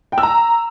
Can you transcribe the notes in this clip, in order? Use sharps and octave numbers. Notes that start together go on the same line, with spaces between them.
G5
E6
A#5